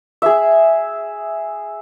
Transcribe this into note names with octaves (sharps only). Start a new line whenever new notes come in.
G#4 E5